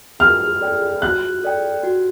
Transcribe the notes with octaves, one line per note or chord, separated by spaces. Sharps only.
F#4 F6
A4 D5 G5
F#4 F#6
A4 D5 G5
F#4